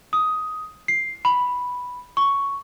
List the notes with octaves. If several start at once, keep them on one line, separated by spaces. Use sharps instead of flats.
D#6
C7
B5
C#6